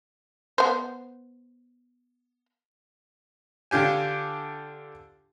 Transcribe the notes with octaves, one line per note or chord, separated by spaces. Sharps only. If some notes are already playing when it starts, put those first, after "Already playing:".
B3 C5
D3 D4 F4 G4 G#5